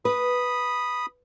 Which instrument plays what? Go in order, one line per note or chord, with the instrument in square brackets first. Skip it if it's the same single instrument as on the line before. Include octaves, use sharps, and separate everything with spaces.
[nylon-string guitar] B4 [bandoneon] B5 D#6